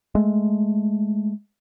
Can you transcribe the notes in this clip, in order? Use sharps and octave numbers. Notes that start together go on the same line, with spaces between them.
G#3 A3